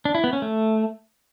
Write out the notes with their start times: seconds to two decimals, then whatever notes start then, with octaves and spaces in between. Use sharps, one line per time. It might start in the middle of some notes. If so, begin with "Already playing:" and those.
0.05 D4
0.15 E4
0.24 B3
0.33 C#4
0.42 A3